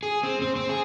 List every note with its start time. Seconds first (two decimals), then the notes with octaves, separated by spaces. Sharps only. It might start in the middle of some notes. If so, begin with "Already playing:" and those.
0.03 G#4
0.23 C4
0.42 C4
0.56 C4
0.69 G#4